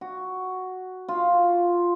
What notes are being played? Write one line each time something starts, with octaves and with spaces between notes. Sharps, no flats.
F#4
F4